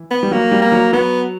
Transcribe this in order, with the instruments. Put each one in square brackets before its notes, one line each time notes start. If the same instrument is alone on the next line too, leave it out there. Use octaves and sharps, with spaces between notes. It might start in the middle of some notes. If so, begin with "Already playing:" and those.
Already playing: [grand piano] E3
[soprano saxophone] B3
[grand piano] G3
[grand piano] F#3 [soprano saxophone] A#3
[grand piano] G3
[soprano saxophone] A#3
[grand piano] F#3
[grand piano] F#3 [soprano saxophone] B3